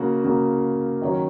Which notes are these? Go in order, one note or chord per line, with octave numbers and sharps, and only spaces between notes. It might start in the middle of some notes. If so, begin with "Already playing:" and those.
Already playing: C#3 A#3 F#4
C#3 A#3 F#4
D#3 F#3 C#4